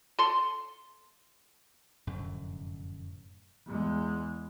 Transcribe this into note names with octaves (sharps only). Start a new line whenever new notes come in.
A4 C6
F1 F#2 A2 D3
E2 G#3